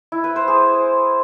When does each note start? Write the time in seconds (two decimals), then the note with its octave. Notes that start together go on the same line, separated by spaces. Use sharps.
0.12 E4
0.24 B4
0.36 C5
0.48 G#4